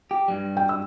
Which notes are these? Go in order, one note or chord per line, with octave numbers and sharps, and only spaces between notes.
G4
G2 G3
G5
E6